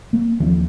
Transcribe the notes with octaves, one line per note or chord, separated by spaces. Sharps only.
A#3
D#2 F3